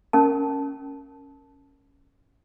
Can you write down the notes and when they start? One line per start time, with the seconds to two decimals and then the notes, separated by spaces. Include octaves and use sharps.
0.13 C#4 A#4 A5